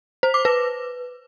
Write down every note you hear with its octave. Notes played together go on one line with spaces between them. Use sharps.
C5
D6
B4